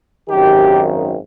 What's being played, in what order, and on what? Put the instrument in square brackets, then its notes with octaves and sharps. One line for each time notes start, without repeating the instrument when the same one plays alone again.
[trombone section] G#1 F#2 D#3 G4